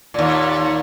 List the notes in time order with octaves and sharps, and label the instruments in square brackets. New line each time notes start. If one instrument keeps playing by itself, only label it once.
[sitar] D#2 A#2